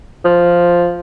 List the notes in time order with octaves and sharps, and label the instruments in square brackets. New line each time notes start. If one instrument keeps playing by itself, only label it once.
[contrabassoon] F3